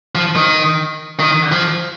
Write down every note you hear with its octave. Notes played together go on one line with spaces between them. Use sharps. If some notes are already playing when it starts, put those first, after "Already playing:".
F3
D#3
D#3
F3